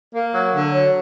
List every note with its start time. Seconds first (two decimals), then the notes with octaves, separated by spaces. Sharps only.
0.15 A#3
0.34 F#3
0.54 D3
0.73 F#3